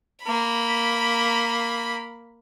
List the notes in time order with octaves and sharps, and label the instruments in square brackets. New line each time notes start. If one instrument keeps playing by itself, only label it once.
[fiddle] A#3 B5